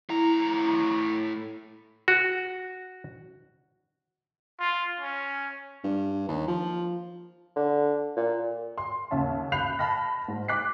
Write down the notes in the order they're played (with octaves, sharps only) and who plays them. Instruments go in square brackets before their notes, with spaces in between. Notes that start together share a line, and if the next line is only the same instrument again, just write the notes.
[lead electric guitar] A2 A#5 [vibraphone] E4
[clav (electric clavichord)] F#4
[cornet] F4
C#4
[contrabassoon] G2
D#2
F3
[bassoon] D3
A#2
[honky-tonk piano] C6
D#2 C#3 C#4 E5 A5
F5 B5 F#6 G6 C7 F7
A5 B5 F6 A#6
G#2
D6 F#6 B6 C7